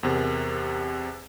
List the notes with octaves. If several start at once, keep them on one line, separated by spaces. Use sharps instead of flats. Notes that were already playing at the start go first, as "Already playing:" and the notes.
E2 C3 A#4